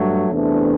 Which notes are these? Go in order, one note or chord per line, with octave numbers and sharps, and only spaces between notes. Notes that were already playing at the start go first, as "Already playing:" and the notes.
Already playing: G2 F#3 A3
E2 C3 E3 A3 D4